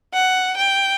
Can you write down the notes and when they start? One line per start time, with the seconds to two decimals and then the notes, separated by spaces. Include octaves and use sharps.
0.13 F#5
0.57 G5